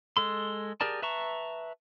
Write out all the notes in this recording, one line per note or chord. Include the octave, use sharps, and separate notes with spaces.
G#3 A4 C6
G4 G#4 A#4 D5 A5
B4 E5 A5 A#5 C#6